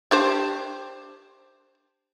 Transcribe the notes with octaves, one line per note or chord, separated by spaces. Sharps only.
D4 G4 C5